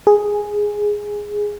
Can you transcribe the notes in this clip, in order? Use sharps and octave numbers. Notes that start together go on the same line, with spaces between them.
G#4